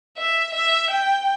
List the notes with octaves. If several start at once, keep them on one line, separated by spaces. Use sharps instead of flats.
E5
E5
G5